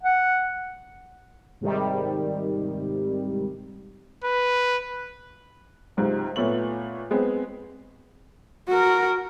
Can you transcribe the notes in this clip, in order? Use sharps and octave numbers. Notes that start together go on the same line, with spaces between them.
F#5
G#2 C3 D#3 G3
B4
C#2 G#2 C3
A#2 A3 B3 C#5 F#7
G#3 B3 C4
F#4 A#4